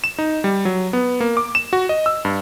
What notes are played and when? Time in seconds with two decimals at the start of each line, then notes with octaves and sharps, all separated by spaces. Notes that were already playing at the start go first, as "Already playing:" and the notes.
0.04 E7
0.18 D#4
0.44 G3
0.65 F#3
0.93 B3
1.20 A#3
1.37 D6
1.55 E7
1.73 F#4
1.89 D#5
2.06 E6
2.25 G2